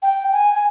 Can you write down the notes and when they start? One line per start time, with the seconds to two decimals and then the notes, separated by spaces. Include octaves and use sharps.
0.02 G5
0.32 G#5
0.54 G#5